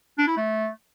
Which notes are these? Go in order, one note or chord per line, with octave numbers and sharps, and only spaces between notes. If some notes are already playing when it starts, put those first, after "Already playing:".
D4
E4
A3